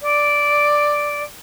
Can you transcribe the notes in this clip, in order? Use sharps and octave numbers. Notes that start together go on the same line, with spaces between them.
D5